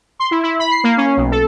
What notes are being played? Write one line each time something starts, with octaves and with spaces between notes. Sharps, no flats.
C6
E4
E4
B5
C7
A#3
C#4
B1
A4